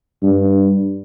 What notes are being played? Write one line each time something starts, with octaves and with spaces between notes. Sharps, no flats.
G2